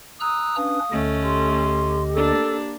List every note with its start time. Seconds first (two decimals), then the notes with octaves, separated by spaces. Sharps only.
0.20 A#5 D#6 E6 F#6
0.56 C#4 D4 B4 F5
0.92 D2 D3 A3 C#4 D#5
1.23 G4 C6
2.13 A#3 D4 A4